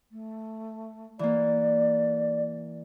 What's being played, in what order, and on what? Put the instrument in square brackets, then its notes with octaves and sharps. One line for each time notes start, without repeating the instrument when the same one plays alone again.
[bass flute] A3
[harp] E3 A#3 [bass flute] D5